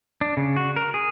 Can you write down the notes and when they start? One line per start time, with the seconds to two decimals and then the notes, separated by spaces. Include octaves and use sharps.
0.21 D4
0.37 C#3
0.56 F#4
0.76 A#4
0.94 G#4